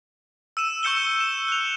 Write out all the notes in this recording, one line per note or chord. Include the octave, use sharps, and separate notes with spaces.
E6 D#7 E7
C#6 E6 G6 C#7 E7 G7
E7
F#6 F7